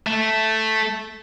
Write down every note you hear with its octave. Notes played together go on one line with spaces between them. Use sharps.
A3